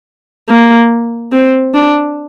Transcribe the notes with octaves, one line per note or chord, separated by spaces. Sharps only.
A#3
C4
D4